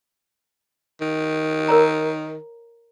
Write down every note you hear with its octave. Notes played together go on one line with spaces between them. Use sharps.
D#3
A#4 C#5 A#5